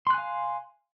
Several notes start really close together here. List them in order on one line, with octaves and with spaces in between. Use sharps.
C6 F#6 G#5 F5